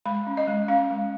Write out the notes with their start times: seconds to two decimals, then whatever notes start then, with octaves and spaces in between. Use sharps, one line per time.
0.06 G#3 B5
0.27 C#4
0.37 D#5
0.48 G#3
0.68 C#4 F5
0.90 G#3